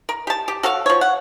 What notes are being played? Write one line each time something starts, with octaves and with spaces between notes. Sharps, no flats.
A#4
G4 A5
G4
F#4 A4 C#5 F5
F3 C#5
F#5